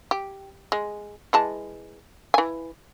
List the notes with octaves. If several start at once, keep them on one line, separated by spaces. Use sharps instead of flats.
G4
G#3
E3 G#3 A5
E3 G#5